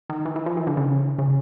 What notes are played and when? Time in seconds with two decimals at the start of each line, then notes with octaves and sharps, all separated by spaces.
0.10 D#3
0.25 E3
0.36 E3
0.46 F3
0.57 E3
0.67 D3
0.77 C#3
1.19 C#3